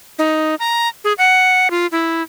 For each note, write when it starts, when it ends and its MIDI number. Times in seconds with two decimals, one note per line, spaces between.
0.19 0.55 63
0.59 0.88 82
1.04 1.13 68
1.18 1.70 78
1.70 1.87 65
1.92 2.22 64